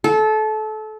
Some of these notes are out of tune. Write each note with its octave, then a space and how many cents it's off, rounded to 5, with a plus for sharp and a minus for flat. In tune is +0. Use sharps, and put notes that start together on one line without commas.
A4 -25